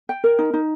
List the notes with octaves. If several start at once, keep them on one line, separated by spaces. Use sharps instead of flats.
G5
A#4
D#4
D#4